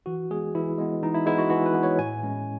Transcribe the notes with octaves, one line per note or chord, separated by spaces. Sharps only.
E3 F#4
G#3 B3 G#4
E3 E4
G#3 B3
E3 D#4
E4
G#3 B3 E4
F#4
E3 F#4
B4
G#3 B3
C#5
A2 G#5
G#3 C#4